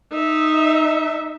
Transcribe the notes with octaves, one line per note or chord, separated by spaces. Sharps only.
D#4 E5